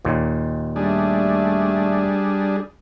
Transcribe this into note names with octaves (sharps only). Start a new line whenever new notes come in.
D#2 A#2
G3 A3 D4 G#4